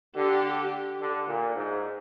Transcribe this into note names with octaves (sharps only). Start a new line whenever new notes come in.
D3 G4
D3
A#2
G#2